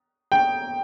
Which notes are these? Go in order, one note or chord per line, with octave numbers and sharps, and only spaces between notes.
G5